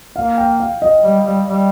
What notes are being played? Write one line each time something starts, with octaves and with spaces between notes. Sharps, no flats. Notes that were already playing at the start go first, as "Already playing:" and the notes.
A#3 F5
G5
F5
D#5
G3
G3
G3